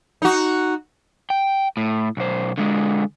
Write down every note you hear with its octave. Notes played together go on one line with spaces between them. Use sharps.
D#4 F#4
G5
A2
B1 C5
D3 G#3